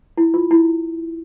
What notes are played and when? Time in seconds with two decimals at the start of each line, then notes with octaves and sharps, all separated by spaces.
0.17 E4
0.34 F4
0.51 E4